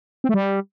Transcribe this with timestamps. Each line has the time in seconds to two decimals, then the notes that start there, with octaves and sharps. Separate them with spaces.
0.24 C4
0.29 A3
0.34 G3